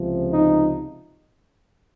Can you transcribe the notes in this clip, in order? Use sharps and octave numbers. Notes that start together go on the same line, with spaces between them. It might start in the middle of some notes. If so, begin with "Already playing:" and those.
Already playing: C#2 C3 F3
D#4